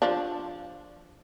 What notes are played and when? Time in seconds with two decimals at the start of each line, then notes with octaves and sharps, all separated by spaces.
0.02 F3 D4